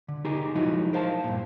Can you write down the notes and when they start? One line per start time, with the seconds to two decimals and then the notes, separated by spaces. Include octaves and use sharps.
0.08 D3
0.25 D#4 G4 G#4 A#4
0.55 F3 F#3 G#3 D#4 E4 F#4
0.93 A#4 C5 F5 A5
1.24 G2 A#2